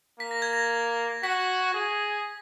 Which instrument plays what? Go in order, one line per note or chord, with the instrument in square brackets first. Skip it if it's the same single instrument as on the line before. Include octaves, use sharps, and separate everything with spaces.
[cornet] A#3 [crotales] B6
[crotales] A#6
G#6
A#6
[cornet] F#4 [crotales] B6
[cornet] G#4